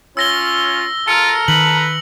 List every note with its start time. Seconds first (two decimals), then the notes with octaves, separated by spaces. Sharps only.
0.17 C#4 F4 C#5 E6 A#6 G7
1.08 F4 A4 A#5 F6 C#7
1.48 D#3 B4 F#7